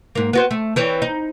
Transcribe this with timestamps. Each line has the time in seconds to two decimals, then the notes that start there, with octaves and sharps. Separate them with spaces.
0.15 G#2 A#3
0.33 B3 F#4 C5
0.51 A3
0.76 E3 C4 C#5
1.02 D#4